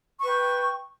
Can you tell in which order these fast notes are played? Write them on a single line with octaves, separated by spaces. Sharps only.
C#6 B4 G5